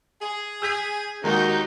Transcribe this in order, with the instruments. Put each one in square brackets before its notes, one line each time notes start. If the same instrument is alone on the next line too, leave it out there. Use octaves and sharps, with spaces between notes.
[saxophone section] G#4
[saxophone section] G#4 [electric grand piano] E6 G6 B6
[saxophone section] D#2 [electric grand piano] D#3 G#3 F#4 [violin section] D#4 G6